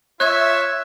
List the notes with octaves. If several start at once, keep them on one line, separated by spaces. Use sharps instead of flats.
F4 C#5 E5 F#6 G#6